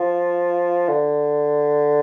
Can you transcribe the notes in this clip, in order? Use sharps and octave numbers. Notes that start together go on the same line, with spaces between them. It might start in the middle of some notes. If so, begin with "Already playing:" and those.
Already playing: F3
D3